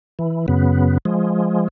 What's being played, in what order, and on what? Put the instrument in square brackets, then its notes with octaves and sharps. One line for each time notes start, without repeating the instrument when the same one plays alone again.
[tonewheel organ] E3
F#2 C#3 B3
F3 G#3